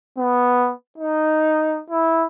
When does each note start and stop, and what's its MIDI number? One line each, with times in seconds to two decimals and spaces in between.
0.18 0.73 59
0.98 1.82 63
1.90 2.26 64